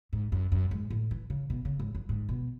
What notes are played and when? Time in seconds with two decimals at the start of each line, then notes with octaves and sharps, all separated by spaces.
0.13 G#2
0.32 F#2
0.52 F#2
0.71 G#2
0.90 A2
1.11 E3
1.30 C#3
1.50 B2
1.65 C#3
1.79 G#2
1.95 F#2
2.09 G#2
2.29 B2